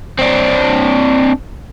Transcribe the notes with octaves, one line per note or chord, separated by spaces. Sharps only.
C4 D4